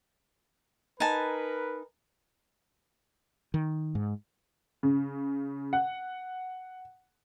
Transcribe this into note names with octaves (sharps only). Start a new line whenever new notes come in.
D#4 A#4 B4 G#5 A5
D#3
G#2
C#3
F#5